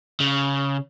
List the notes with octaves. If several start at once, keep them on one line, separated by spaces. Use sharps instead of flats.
C#3